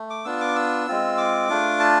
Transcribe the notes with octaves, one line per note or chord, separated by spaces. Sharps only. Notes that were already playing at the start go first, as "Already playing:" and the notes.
Already playing: A3
D6
B3 D4 F4 E6
D6
E6
G#3 C4 F4
D6
A3 D4 F4
A5